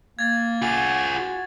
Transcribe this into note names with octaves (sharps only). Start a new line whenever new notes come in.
A#3 G#6 A6
F4 G#4 F#5 A6
F#4